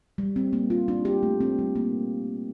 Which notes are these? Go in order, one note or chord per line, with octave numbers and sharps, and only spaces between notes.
G3
C4
A#3
F4
D4
G4
A3
C4
G3
A#3